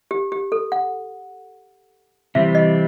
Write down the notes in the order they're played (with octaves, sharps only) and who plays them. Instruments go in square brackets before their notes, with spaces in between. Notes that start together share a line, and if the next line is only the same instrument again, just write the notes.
[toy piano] G4
G4
A4
F#5
[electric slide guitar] C3 E3 G3 C4 [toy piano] E5
[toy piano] D#5